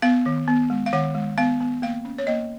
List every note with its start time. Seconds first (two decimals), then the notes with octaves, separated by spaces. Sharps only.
0.02 B3 F5
0.26 D#3
0.48 B3
0.70 G#3
0.86 F5
0.93 D#3 F#5
1.15 G#3
1.38 B3 F5
1.61 B3
1.82 A#3 F5
2.05 C#4
2.18 C#5
2.27 A#3 D#5